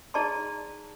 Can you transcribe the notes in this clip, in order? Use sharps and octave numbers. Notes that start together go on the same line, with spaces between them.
D#4 G#4 D5 A5 A#5 C6